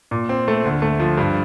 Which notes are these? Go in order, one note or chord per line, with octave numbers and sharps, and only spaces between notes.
A#2
C4
A3
D2
A3
F3
G2